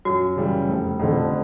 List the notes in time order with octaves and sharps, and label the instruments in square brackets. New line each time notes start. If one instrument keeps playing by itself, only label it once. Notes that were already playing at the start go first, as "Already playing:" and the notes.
[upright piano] F#2 [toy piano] F#4
[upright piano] C#3 E3 G3
F1
F2 D3